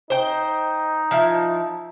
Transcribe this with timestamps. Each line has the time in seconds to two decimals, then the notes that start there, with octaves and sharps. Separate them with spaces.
0.10 D#4 C5 G5
1.11 F3 E4